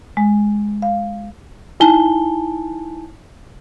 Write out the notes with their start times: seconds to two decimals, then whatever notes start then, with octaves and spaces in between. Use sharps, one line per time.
0.17 G#3
0.82 F5
1.80 D#4 E4 G#5 A5 G7